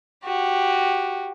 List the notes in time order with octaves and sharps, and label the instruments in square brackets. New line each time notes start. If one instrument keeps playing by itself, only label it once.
[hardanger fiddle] F#4 G4